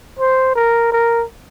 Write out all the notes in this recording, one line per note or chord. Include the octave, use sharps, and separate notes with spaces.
C5
A#4
A#4